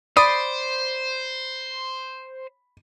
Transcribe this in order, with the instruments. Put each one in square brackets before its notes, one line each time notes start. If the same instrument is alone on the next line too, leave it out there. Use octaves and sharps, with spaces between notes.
[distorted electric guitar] C5 [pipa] D5 [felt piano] B5 [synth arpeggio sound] D#6